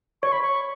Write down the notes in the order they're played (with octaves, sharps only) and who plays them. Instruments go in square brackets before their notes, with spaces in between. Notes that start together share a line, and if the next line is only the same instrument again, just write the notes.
[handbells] C#5 [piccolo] C#6
[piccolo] B5
C#6